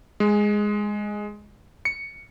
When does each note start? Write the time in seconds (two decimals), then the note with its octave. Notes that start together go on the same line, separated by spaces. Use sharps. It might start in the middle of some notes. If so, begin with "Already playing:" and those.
0.20 G#3
1.85 C#7